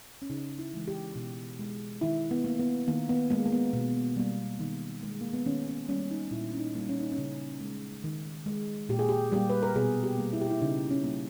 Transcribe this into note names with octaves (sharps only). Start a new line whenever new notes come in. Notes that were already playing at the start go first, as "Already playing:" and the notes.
C#4
C#3 D#4
E4
E3 G#3
G4
B2
G#3
D#3 E4
B3
A#3
B3
D#3 A#3
B3
G#3 A#3
A#3
B3
B2
G3 A#3
D#3
G#3
A#3
B3
D#3 C#4
C#4
G3 A#3 C#4
D#4
A#2 E4
C#4
D#4
G3 A#3
C#4
D#4
C#4
C#3
G#3
D#3
G#3
A#2 G4
G#4
G4
G3 A#3 G4
B4
A#4
B2 G#4
G4
G3 A#3
E4
G4
E4
C#3 D#4
C#4
G3 A#3